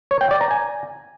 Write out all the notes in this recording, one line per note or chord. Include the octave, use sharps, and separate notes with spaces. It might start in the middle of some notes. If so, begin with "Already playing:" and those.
C#5
G5
D5
A#5
G#5